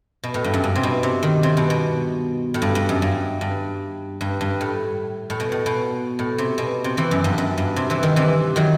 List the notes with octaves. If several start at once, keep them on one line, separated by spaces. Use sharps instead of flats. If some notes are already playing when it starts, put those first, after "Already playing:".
B2
A2
G2
F#2
G2
C3
B2
C3
D#3
C3
B2
B2
A2
G2
G2
F#2
G2
G2
G2
G2
A2
A2
B2
A2
B2
A2
C3
B2
C3
C3 E3
F#2
G2
F#2
G2
C3
C3 E3
D#3
C3 E3
D#3 F#3